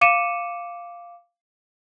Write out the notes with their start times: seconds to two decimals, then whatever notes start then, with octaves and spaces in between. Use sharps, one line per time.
0.01 F5 D6 C#7 D#7 E7